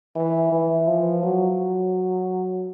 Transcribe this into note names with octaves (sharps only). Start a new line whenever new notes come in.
E3
E3
F3
F#3